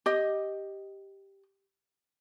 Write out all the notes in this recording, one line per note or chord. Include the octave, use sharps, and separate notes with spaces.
G4 D#5